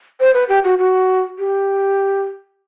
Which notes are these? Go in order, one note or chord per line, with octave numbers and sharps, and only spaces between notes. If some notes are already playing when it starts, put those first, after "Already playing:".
C5
B4
G4
F#4
F#4
G4